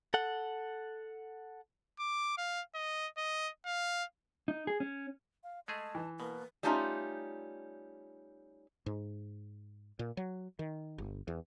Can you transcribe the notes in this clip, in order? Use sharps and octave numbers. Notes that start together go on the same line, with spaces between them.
A4 F#5
D6
F5
D#5
D#5
F5
D#4
G#4
C#4
F5
G#3 A3 G#4 D#5 A5
E3
B2 A#3 B4
G3 A3 C#4 D#4 F4
G#2
A#2
F#3
D#3
G1
E2